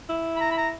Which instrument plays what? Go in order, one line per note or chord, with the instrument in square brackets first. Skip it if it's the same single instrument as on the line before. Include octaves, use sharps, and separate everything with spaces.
[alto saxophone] E4
[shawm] B5
A#5
B5
A#5